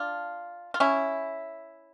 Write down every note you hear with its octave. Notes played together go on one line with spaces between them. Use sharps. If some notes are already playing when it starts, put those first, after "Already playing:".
Already playing: D4 F4
F4
C#4 E4